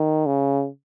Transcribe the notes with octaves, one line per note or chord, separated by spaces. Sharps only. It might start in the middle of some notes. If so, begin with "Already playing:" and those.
Already playing: D#3
C#3